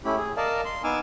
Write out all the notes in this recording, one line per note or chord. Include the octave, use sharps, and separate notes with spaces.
A3 C#4 E4 G4 B5
G#4
A#4 D5 D#5 F5 A5
C6
B3 D#4 G#5 D6 E6 F6